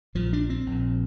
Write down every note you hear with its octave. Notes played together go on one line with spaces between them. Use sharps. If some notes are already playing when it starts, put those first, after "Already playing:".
A#1 A#2 F3
D4
C4
A#1 A#2